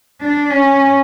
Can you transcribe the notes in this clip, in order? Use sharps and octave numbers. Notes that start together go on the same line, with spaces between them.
D4
C#4